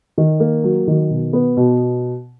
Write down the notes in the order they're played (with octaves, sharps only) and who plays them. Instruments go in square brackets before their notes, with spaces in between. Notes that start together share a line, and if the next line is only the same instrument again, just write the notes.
[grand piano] D#3
A#3
F#3
D#3
B2
B3
B2